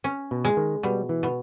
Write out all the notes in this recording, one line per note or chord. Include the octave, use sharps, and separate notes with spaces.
C#4
B2
G#3
D#3
B2 G3
E3
B2